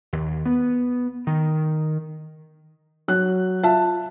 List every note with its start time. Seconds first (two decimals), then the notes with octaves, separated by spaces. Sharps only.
0.13 D#2
0.46 B3
1.27 D#3
3.08 F#3 F#6
3.64 F4 E5 F5 A5